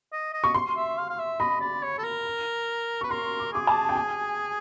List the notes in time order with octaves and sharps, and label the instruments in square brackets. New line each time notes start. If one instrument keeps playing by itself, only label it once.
[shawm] D#5
D#5
[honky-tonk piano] C#6
C6
[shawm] E5
F5
F5
E5
[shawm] D#5 [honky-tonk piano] B5
[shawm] D5
C#5
A4
A#4
[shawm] B4 [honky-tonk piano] C#6
[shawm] A#4 [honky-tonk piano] C6
[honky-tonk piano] D6
[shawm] G#4 [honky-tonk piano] D6
[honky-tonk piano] A5
G5
G#5